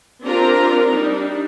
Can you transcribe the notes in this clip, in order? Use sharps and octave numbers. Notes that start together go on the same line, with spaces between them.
C4 D4 F4 G4 A#4 A#5
G3 D4 D#4